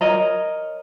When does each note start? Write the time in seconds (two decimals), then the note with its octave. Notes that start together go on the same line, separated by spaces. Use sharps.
0.01 A#4 C#5 D#5 A#5